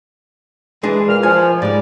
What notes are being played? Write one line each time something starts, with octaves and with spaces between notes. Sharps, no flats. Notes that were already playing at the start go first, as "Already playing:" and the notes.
E3 G#3 D4 G#4
A#2 F6
F3 G#5
G#2 G3 G#3 D5